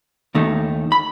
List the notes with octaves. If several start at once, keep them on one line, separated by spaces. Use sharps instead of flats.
D#2 D#3 A3 D#4
B5